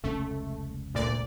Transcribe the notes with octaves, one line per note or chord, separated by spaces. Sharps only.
F1 C#2 A3 C#4
D2 A#2 D5